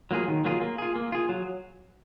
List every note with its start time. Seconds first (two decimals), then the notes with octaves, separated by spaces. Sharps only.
0.11 F#3 A#3 F4 G#4
0.28 D#3
0.44 F#3 A#3 F4 G#4
0.61 A#3
0.78 F4 G#4
0.96 A#3
1.12 F4 G#4
1.29 F#3